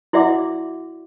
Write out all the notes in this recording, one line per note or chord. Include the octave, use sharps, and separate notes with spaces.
E4 F#4 D5 E5 F#5 D6